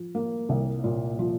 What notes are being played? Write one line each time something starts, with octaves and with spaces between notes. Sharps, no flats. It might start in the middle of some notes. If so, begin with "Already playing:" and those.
Already playing: F3
A#3
C2
A#2
F3